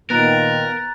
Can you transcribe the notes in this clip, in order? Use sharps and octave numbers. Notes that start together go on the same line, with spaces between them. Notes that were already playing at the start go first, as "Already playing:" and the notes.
A#2 D#3 B3 A#4 A#5 F#6 A6